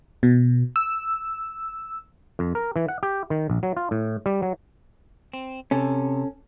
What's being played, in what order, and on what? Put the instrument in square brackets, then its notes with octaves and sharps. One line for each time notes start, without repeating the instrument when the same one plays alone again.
[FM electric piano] B2
E6
[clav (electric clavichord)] F2
A#4
E3
F#5
G4
D#3
A#1
F#3
F4
A2
G3
F#3
[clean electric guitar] C4
[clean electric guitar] C3 [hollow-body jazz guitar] C#4 A4